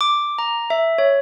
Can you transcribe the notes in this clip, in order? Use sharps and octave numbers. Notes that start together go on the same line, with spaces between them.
D6
A#5
E5
C#5